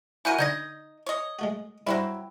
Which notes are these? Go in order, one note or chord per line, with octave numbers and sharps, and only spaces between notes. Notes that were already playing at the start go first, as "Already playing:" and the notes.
E4 F#4 A#4 G#5 G6 D#7
D3 D#4 D#5 G6 G#6 A#6
C#5 D#5
G#3 A3 F#4
G2 F#3 C4 E4